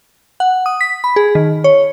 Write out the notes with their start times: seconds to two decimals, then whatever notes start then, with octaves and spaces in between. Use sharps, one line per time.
0.40 F#5
0.66 D#6
0.81 B6
1.04 B5
1.16 G#4
1.35 D#3
1.64 C#5